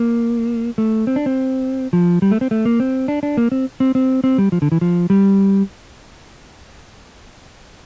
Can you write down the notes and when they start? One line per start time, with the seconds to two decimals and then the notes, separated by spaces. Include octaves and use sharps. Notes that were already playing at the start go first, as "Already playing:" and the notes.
Already playing: A#3
0.78 A3
1.07 C4
1.16 D4
1.26 C4
1.93 F3
2.22 G3
2.31 A3
2.41 C4
2.51 A3
2.65 A#3
2.80 C4
3.08 D4
3.23 D4
3.37 A#3
3.52 C4
3.80 C4
3.95 C4
4.24 C4
4.38 G3
4.52 F3
4.62 D3
4.72 E3
4.81 F3
5.10 G3